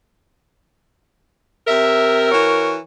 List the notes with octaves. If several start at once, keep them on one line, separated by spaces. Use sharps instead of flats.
C3 A#4 E5
E3 F#4 C#5